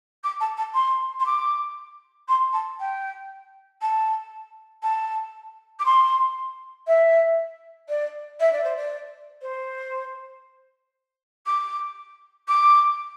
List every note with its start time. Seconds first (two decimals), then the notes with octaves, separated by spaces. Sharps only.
0.23 D6
0.40 A5
0.57 A5
0.74 C6
1.20 C6
1.26 D6
2.28 C6
2.53 A5
2.79 G5
3.81 A5
4.83 A5
5.79 D6
5.85 C6
6.87 E5
7.88 D5
8.40 E5
8.52 D5
8.64 C5
8.76 D5
9.42 C5
11.46 D6
12.48 D6